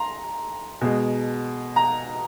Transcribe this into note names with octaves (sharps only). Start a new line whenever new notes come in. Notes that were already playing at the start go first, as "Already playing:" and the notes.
Already playing: A#5 C6
B2 G#3
A#5